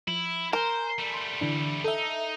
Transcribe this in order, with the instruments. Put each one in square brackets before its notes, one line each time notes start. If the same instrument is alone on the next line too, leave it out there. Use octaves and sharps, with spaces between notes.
[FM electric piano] F3 [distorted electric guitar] E4
[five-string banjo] A#4 [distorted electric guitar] C5 [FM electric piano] G#5
[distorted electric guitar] G3 A3
[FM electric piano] C6
D3 E3 D4
[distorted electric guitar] D#4 [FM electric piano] A4 E5